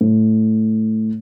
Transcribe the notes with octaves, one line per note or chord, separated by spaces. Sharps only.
A2